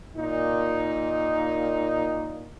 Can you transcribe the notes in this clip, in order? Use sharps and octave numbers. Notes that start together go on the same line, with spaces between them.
A#2 D#4